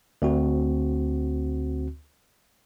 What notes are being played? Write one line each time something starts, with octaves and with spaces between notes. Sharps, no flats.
D2 C4 F#4